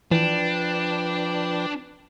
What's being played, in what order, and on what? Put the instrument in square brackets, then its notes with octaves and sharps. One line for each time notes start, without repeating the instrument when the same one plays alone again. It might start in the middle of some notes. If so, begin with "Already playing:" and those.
[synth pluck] E3 [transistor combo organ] F3 B4 G5 [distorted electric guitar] D4